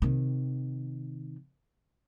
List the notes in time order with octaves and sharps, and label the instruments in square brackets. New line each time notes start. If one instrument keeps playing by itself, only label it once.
[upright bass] C3 D#3